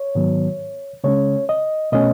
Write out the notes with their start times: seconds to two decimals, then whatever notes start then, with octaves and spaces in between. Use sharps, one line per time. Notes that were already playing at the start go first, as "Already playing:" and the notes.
Already playing: C#5
0.15 G#2 D#3 F#3 B3
1.04 C#3 G#3 C#4 C#5
1.49 D#5
1.92 B2 A3 C#4 D#5